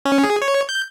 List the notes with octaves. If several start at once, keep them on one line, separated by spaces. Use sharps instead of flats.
C#4
G#4
C#5
G6